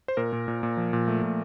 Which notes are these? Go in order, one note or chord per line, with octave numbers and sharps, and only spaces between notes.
C5
A#2 A#4
A#2
A#2
A#2
F3
A#2
A3
A#2